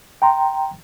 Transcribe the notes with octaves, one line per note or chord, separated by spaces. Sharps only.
G5 A#5 C6